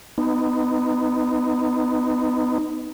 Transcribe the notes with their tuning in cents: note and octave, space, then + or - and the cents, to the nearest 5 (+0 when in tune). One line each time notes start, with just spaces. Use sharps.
B3 +25 D#4 -5